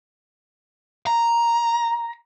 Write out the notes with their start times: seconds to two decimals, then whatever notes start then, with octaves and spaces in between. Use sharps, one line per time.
1.07 A#5